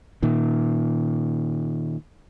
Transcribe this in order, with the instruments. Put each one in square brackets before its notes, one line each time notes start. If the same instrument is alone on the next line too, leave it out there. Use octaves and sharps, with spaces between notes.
[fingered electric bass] A#2 D#3